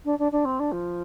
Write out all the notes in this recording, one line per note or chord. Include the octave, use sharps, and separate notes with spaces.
D4
D4
D4
C4
D4
F3